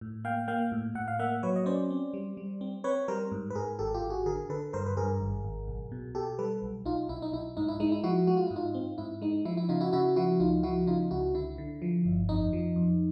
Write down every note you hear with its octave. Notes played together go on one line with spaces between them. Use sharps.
A2
A#3 F5 G5
A#3 F5 G5
A2
A2 F#5
F5
A#3 E5 F#5
F#3 B4 C#5
D#5
C#4 C5 D5
C4
G3
G3
C4
C4 B4 C#5
G3 A#4 C5
G#2
B4
G#2 G#4 A#4
G#1 G4 A4
F4 G4
G#1
F#4 G#4
D3 G#4 A#4
D3 A4 B4
G2 A#4 C5
B4
G2 G#4 A#4
G#1
G#1
B1
B2
B2 G4 A4
G3 A4 B4
B1
B1 D#4 F4
B1 E4
D#4
B1 E4
G#2 D#4
E4
G#3 D#4
E4
F3 E4 F#4
G#3 F#4
F4
G#2 E4
D#4 F4
C4
G#2 E4
G#3 D#4
F3 E4
E4
C#3 D#4 F4
E4 F#4
C#3 E4 F#4
F3 E4 F#4
C#2 D#4 F4
F3 E4 F#4
C#3 D#4 F4
C#2 E4 F#4
D3 E4
D3
F3
G1
F2 D#4
F3
F2